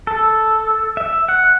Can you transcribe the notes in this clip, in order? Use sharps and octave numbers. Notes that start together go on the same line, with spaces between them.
A4
E5
F#5